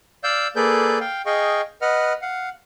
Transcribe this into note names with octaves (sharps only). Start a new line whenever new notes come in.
D5 F5 E6 G6
A#3 G#4 A4 B4 D5 G6
F5 G5
G#4 D#5 F5 G5 C#6
B4 D#5 F#5 F6
F5 F#5